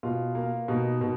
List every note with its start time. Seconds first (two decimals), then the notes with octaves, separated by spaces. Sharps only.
0.03 B2 F4
0.35 A#3
0.68 B2 D#4
1.01 B2